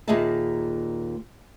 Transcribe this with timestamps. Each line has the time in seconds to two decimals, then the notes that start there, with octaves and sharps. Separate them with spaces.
0.08 D#2 A#2 G#4 D#5 E5 A5